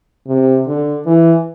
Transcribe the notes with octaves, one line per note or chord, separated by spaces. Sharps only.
C3
D3
E3